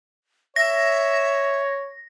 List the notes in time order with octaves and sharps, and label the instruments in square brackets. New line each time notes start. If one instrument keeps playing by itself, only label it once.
[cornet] C#5 [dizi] E5 [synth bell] A#6